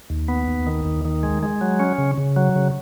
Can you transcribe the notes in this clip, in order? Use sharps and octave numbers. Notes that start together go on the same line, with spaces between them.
D#2
B3
D#2
D#3
D#2
D#3
G#3
G#3
F#3
C#4
C#3
C#3
F#3
C#3